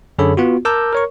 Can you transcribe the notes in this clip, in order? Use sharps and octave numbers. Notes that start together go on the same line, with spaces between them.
F#2 D3 G#4 A4 C#5 B5
B3 F4 F#4
A#4 A5 A#5 D6 E6 G6
A#4 C#5 C#6